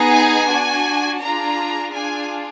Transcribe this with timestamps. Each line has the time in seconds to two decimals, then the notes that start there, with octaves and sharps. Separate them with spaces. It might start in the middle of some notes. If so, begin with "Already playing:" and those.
Already playing: B3 D#4 G#4
0.11 G#5
0.49 D4 F#4
1.20 D4 F4 G#4 A#5
1.93 D4 F4 G#4 G#5